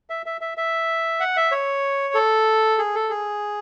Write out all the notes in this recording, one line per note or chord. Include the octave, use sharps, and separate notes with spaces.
E5
E5
E5
E5
F#5
E5
C#5
A4
G#4
A4
G#4